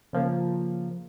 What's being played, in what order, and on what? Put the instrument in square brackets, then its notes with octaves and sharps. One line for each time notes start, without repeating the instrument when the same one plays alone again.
[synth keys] C#3 F3 A#3